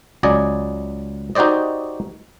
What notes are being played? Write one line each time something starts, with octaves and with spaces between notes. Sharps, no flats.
C#2 F#3 D5 D#5 G#5
D#4 F#4 G4 C5 D5 D#5